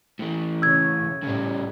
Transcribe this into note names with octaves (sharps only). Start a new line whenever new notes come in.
A2 E3
C#3 C#4 E6 G#6
A2 C#3 G3